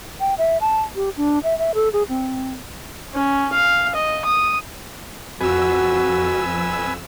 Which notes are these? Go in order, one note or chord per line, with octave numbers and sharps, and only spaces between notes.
G5
E5
A5
G4
D4
E5
E5
A4
G#4
C4
C#4
F5
D#5
D#6
F2 F#4 B4 G#5 E6